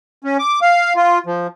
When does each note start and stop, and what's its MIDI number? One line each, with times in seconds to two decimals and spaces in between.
0.24 0.37 61
0.39 0.59 86
0.62 0.93 77
0.96 1.19 65
1.26 1.47 53